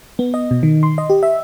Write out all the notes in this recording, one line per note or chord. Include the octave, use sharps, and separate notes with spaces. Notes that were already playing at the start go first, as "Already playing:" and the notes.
B3
D#5
B2
D#3
C6
D#5
G4
E5